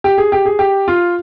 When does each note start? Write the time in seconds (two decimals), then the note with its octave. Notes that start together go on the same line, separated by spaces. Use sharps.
0.04 G4
0.18 G#4
0.32 G4
0.45 G#4
0.59 G4
0.88 F4